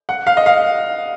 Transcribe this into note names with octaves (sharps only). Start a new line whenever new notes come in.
F#5
F5
D#5
F5